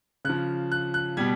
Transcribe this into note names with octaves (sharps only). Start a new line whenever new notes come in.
C#3 F3 F#6
F#6
F#6
B2 G3 G#6